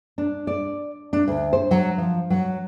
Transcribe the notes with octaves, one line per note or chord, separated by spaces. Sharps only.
D4
D5
D4
D2
C5
F#3
F3
F#3